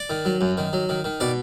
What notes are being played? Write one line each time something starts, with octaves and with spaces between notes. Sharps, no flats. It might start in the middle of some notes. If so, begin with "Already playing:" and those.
Already playing: D5
D#3
F#3
F#2
D#3
F#3
D#3
D#3
B2 D5